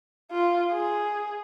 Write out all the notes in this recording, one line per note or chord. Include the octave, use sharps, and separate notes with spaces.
F4
G#4